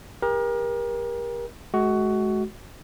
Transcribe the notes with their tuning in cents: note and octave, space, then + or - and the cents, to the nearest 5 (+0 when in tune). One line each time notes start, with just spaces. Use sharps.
G4 +40 A#4 +30
G#3 +40 F#4 +15